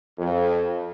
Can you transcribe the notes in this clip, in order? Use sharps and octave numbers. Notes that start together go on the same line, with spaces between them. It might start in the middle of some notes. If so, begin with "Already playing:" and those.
F2